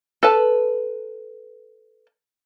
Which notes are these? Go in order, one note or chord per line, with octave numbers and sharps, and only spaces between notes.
A4 B4 A5